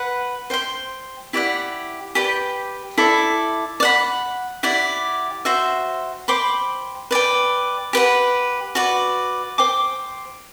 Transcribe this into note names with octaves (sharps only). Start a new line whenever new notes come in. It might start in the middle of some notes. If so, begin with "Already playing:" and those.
Already playing: B4 F#5
C5 G5 C6
E4 G4 D5 F#5
G4 B4 D5 G5
E4 A4 D5
D5
F#5 B5
E4 G4 D5 F#5
F#4 C5 E5 G5
C5 G5 B5 D6
B4 D5 G5
G4 B4 F#5
F#4 B4 D5
C5 G5 D6